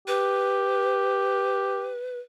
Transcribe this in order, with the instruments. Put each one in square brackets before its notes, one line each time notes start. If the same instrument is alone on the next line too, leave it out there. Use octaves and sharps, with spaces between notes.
[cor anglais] G4 [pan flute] B4